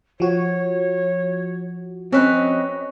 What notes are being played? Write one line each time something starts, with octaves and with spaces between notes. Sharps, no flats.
F3 F#4 C#5
C4 C#4 B4 D#5